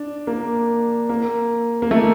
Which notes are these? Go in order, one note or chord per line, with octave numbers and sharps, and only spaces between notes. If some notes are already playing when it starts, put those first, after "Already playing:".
Already playing: D4
A#3
A#3
A#3
A3